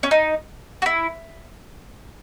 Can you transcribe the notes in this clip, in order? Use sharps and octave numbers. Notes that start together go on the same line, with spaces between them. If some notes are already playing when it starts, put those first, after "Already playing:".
C#4
D#4
F#4
E4